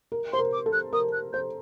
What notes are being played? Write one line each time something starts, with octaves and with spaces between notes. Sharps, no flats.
A#4
C5 C6
A#4
D6
A4
F#6
A#4 D#6
F#6
C5 G6